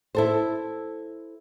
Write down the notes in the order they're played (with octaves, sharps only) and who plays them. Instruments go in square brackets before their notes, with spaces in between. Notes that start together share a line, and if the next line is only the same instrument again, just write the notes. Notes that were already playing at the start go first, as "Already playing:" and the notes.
[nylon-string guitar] E4 A4 C5